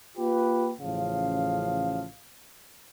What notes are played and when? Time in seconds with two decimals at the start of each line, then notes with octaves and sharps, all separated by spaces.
0.18 A#3 F4 G4 B4
0.80 A1 C#3 F3 F5